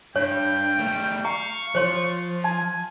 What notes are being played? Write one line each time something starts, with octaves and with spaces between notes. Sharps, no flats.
G2 C#5 G5
G3 A3
F5 A#5 C#6
F3 C5 C#5 C6
G#5 A5